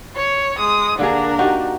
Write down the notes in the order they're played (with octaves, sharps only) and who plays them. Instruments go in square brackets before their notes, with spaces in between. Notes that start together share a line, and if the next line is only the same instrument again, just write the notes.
[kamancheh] C#5
G#3 D#6
[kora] D3 A#3 G#4 [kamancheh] D4 A#4
[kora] D#4 F#4 G4